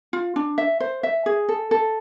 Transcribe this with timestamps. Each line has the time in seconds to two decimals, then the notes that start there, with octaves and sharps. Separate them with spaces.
0.13 F4
0.36 D4
0.58 E5
0.80 C5
1.03 E5
1.26 G#4
1.49 A4
1.71 A4